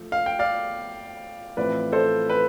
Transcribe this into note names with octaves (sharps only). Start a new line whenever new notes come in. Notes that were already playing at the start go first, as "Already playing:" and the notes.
Already playing: F3 A3
F5
G5
D5 F5
A1 A2 F3 C4 B4 D5
A4 C5
B4